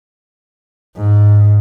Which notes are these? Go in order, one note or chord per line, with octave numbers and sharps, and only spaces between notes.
G#2